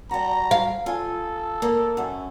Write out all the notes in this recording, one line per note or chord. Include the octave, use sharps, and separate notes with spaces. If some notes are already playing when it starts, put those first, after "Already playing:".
G3 F#4 A#5
F5
F4 A4 G#5
A#3
F#2 C#4